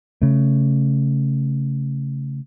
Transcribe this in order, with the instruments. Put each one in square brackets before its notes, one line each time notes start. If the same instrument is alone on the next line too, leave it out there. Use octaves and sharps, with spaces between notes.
[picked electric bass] C#3 A3